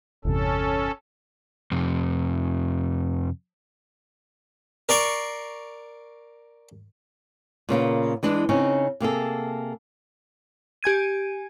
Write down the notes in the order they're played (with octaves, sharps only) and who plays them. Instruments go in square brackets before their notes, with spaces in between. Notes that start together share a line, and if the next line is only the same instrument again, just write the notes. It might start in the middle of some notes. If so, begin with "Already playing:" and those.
[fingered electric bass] G1 E2 C3 [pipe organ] C#4 A4
[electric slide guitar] F2 C3
[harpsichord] A#4 D5 C6 C#6
[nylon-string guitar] A#2 C#3 A#3 B3
E3 G#3 D4
C#3 C4 C#4 D#4
C3 A#3 G#4 A4
[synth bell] G4 G#5 G#6 D#7